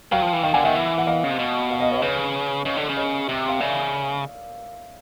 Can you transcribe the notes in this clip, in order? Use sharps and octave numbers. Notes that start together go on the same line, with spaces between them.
F#3 F5 G5
F3
E3
D#3 F5 G5
D3 F#5 G#5
D#3 E5 F#5
E3
F#5
D#5 F5
C#3
C3
B2
D#5 F5
D#5 F5
B4 C#5
C#3 B4 C#5
C#3 C#5 D#5
D3
C#3
C#5 D#5
C3
F5
C#3 D5 E5